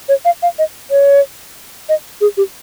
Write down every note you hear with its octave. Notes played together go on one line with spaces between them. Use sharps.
C#5
F5
F5
D#5
C#5
D#5
G#4
G4